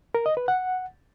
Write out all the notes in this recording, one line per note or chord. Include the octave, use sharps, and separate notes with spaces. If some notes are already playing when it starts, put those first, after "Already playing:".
A#4
D#5
B4
F#5